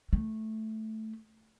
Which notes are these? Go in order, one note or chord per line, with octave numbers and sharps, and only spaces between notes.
A3